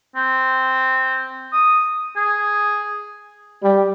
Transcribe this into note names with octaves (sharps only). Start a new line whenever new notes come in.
C4
D#6
G#4
G3